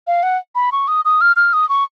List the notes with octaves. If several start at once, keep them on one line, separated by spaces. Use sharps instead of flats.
F5
F#5
B5
C#6
D#6
D#6
F6
F6
D#6
C#6